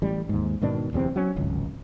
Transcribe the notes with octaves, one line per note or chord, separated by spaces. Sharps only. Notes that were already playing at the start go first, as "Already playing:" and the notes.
A1 G3
D#2 G#2
G#2 B2 D#3 D4
D1 E2 C3 C4
F#3 C#4
D1 G#1 C#2